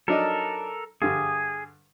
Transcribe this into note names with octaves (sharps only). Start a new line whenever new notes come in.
F#3 D4 D#4 A4 A#4
G2 D3 G#4